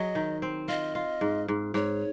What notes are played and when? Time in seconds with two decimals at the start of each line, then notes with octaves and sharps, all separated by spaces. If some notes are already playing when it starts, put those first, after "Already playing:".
Already playing: F#3 G#4 D#5
0.15 D#3
0.42 C4
0.68 F4 D#5
0.95 F4
1.21 G#2
1.48 G#2
1.74 G#2 C#5